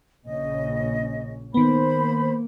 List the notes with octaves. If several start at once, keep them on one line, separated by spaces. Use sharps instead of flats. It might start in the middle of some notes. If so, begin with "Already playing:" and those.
A#1 C#3 C#4 D#5
D#3 A#3 B3 C5 B5